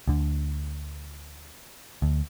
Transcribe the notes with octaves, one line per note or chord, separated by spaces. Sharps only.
D2 D3
D2